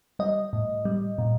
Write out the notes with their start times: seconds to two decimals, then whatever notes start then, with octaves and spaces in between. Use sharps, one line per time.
0.19 G3 D#5
0.53 A2
0.85 G3
1.18 A#2